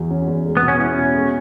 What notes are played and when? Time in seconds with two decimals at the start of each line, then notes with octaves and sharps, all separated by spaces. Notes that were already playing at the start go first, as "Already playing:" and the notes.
Already playing: E2 E3 F#4
0.11 C#4
0.28 E2
0.45 G#3
0.57 B3
0.63 B2
0.68 C#4
0.80 C#4 E4
0.98 B2
1.14 G#3